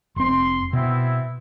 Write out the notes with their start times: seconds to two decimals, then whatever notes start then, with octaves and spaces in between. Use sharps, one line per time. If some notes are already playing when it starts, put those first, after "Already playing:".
0.16 F1 C4 C6
0.73 B2 B3 C4 E4